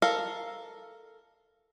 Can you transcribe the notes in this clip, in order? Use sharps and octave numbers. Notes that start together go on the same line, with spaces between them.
A4 A#4 F5